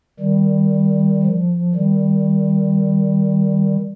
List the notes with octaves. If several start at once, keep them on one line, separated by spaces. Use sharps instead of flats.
D#3 G3
F3
D#3 G3